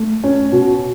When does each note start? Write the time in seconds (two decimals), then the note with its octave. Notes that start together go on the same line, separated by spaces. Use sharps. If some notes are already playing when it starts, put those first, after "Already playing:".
Already playing: A3
0.24 C#4
0.52 B2